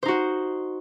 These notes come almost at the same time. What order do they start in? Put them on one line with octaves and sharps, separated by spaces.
C5 D#4 F#4